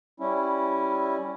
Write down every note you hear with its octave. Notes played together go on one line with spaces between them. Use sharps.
G3 C#4 E4